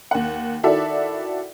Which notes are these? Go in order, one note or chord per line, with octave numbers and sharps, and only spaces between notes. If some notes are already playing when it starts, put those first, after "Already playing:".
D#2 F#5
D#3 E4 F#4 A4 D5 E5